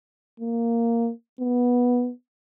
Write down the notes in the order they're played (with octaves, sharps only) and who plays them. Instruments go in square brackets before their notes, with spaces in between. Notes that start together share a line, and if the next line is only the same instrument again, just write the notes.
[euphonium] A#3
B3